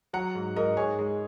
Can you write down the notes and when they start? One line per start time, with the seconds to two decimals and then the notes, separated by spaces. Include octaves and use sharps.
0.13 F#3 F#5 A#5
0.35 G#2
0.56 G#2 A#4 D#5
0.77 G#2 G#4 C#5
0.99 G#3